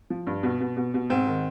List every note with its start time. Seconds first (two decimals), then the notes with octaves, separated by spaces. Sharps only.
0.10 F3
0.27 G2
0.43 B2
0.60 B2
0.77 B2
0.94 B2
1.10 G#2 C4
1.27 D#3